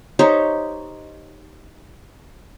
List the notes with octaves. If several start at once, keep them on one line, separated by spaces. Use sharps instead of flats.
D#4 G4 C5 C#5